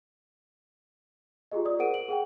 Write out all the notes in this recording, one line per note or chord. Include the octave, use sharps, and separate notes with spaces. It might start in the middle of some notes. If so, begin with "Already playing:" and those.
F4 G4 G#4 D#5
D5 D#6
G#4 A#4 C5 F#5 D7 D#7
D7 F#7
G#4 F#5 G5